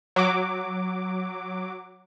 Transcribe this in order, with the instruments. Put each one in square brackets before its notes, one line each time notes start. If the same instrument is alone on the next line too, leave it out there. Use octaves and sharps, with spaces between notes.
[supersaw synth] F#3 D6